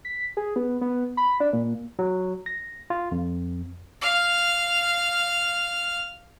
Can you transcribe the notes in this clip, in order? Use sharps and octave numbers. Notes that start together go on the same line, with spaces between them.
B6
G#4
B3
B3
B5
D4
A#2
F#3
A#6
F4
F2
F5 F6